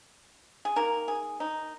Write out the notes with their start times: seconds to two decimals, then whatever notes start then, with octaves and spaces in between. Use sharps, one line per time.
0.65 G#4
0.76 D#3 A#3 A#4
1.08 G#4
1.40 D#4